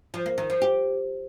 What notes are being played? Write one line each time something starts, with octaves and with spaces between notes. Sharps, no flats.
F3
A#3
D#3
F3
G4